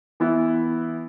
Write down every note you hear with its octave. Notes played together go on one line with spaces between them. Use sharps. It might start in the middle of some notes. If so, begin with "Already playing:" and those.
E3 B3 E4